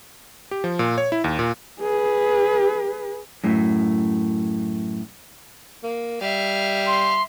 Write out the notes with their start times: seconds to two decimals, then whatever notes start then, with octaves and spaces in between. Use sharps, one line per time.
0.51 G4
0.64 F3
0.79 A#2
0.98 C#5
1.12 E4
1.24 D#2
1.39 A#2
1.81 G#4 B4
3.44 F#2 A2
5.83 A#3
6.21 G3 E5 F5
6.87 C6